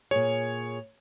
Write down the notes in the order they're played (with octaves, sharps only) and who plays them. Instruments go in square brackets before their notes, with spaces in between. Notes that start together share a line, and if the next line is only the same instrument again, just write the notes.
[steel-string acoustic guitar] A#2 G#4 [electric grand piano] C#5